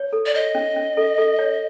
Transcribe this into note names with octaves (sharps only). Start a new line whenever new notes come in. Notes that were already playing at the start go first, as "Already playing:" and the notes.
Already playing: C#5
A4
D5
C#5 D#5
C#4
C#4
A4
A4
C#5